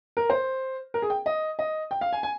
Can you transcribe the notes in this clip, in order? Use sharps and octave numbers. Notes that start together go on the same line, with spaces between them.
A#4
C5
A#4
G#4
G5
D#5
D#5
G5
F5
G#5
G#5